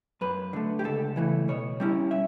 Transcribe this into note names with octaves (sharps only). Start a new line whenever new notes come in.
F#2 B4
D3 A3
G4
C#2 A4
C#3 E3 A3
B2 C#5
G3 C#4 E4
E5